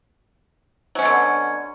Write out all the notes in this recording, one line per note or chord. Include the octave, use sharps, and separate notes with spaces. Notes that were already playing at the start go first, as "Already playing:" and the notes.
B2 D3 F#3 C#4